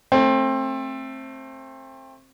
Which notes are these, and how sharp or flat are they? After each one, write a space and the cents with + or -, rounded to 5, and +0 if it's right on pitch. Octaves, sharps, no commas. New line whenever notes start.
A3 +10 C4 +25